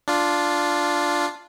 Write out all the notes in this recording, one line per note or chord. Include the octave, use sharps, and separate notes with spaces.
D4 F4